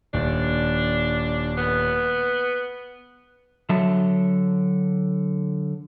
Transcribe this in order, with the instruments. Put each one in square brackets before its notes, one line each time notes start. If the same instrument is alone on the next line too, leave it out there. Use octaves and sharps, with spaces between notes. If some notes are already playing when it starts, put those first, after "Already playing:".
[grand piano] D#1 [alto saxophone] D4
[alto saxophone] B3
[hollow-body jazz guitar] D3 F#3 D#5 E5 A5